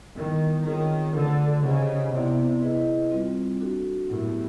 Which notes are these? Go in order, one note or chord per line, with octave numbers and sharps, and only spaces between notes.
D#3 G3 B3 E4
D#3 C4 F4 G#4 C#5
D3 A3 D4 F4 G#4 B4
C#3 D#4 G4 C5 D#5 F#5
C3 B3 E4 A4 D5
E4 G#4 B4 D#5
G3 C4 F4
D4 F#4 A4
A2 F#3 B3 E4 G4 A#4